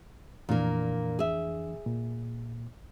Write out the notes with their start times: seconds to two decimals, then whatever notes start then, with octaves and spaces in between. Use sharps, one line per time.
0.49 F2 A#2 E3 A#3 D4
1.19 G#4 E5
1.86 A#2